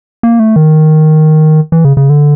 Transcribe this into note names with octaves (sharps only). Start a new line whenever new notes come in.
A#3
A3
D#3
E3
C#3
C#3
D3